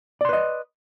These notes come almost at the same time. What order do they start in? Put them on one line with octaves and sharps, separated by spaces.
D5 C6 B4 D#5